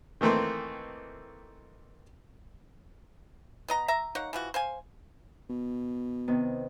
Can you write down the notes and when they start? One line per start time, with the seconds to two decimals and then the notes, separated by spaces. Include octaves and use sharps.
0.21 D#3 E3 A3 A#3 C4
3.68 B3 D#5 A#5
3.88 E5 A#5
4.15 A#3 D#4 C#5 F#5
4.33 E3 F3 F#4
4.54 C5 F5 G#5
5.49 B2
6.28 C3 D#3 B3